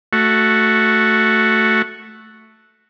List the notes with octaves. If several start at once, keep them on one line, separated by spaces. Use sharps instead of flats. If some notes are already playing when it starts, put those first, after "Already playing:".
A3 F#4